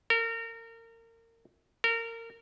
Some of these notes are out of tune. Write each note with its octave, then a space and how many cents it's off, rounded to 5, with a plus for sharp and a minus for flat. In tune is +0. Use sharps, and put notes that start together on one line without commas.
A#4 -30
A#4 -25